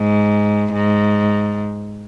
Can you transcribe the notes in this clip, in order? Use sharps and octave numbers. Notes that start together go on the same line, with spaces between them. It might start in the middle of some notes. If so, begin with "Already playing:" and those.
Already playing: G#2
G#2